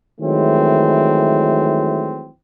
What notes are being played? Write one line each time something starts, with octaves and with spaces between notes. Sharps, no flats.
D#3 E3 F#3 G#3 A3 C4